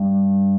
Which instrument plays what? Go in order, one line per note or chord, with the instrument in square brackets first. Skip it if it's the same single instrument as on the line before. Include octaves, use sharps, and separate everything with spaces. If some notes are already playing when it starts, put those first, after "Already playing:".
Already playing: [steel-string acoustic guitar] G2